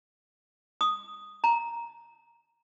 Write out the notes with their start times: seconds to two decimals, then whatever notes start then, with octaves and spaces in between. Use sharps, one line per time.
0.81 D#6
1.44 A#5